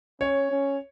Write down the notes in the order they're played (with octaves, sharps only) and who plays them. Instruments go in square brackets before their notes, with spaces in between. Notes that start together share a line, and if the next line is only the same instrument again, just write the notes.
[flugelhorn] C#4 [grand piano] C#5
[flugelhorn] C#4